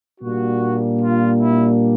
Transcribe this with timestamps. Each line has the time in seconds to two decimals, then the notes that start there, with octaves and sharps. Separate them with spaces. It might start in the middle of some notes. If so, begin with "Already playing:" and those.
0.20 A#2 G3 A#3 D4 F#4
1.02 F4
1.41 E4